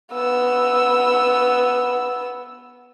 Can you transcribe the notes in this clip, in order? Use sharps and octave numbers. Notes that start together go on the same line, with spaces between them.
B3 E6